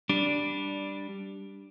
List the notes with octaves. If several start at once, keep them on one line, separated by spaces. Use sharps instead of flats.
G3 D4